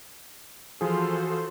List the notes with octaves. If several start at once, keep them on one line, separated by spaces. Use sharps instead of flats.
E3 F3 F4 F#4 G#4 A4 C5